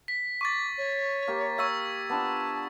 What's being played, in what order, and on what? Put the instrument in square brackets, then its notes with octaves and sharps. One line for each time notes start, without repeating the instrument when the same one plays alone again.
[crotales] B6
[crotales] C#6 A6 [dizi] D6
[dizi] C#5
[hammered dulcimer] A#3 G4
[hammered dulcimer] F5 [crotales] C#6 E6 G#6
[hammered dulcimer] B3 D4 F4 [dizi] A5